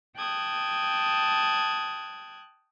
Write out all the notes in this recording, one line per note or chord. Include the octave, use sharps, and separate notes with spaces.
G5 A5 D#6 F#6 G#6